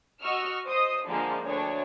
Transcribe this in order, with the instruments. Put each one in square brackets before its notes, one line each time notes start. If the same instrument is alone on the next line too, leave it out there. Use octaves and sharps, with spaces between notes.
[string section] F#4 D#5 C#6 E6 F6
C5 D#5 D#6
D3 F3 G#3 A#3
D2 D4 C#5